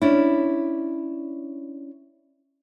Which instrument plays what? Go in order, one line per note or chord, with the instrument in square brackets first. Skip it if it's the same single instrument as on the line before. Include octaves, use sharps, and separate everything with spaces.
[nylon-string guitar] C#4 D4 E4